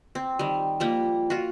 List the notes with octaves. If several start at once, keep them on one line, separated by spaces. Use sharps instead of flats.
C4
D#3 G3
F3 G3 A#3
F4 F#4